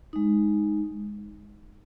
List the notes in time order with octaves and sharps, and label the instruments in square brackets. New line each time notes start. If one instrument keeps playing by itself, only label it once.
[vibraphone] G#3 D#4